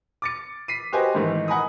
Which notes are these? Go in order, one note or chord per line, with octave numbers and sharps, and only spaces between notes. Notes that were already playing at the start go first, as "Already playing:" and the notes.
D6 A6 C#7
B6 C7 D#7
F#4 G4 B4 C5 D#5 G#5
G#2 D#3 E3 A3
D#5 F#5 G#5 A#5 B5 D#6